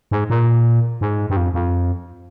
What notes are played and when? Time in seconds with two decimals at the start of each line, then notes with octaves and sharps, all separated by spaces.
0.11 G#2
0.30 A#2
1.01 G#2
1.30 G2
1.37 F2
1.54 F2